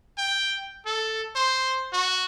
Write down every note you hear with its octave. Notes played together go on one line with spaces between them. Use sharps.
G5
A4
C5
F#4